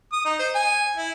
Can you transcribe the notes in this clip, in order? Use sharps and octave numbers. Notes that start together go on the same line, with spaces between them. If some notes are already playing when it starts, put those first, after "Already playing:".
D#6
D#4
C5
G#5
E4